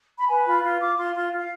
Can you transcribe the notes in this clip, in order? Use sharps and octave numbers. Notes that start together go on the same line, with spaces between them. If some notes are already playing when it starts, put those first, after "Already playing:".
B5
B4 G#5
F4 B5
F4 C6
F4 D6
F4 C6
F4 C6
F4
F5